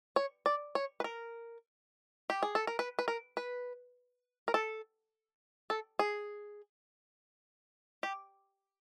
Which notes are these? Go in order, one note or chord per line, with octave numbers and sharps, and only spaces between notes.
C#5
D5
C#5
B4
A#4
G4
G#4
A4
A#4
B4
B4
A#4
B4
A#4
A4
A4
G#4
G4